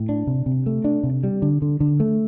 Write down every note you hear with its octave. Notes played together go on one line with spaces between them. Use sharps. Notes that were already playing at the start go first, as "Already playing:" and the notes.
Already playing: A2
D4
C3
C3
A3
D4
C3
G3
D3
D3
D3
A3